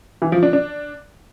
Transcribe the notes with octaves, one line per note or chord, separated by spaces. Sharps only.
E3
F3
D4
D4